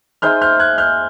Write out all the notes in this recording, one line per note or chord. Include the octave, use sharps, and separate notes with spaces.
D#4 G#4 C5 E5 F6 G6
F6 G6
F#6 G#6
F6 G6